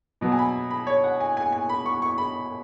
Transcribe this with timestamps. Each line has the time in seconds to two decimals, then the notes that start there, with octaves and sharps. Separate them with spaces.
0.21 B2 F#3 B3
0.32 G#5
0.39 B5
0.71 B5
0.87 C#5
1.04 F#5
1.20 G#5
1.37 G#5
1.52 G#5
1.69 B5
1.86 C#6
2.02 C#6
2.18 B5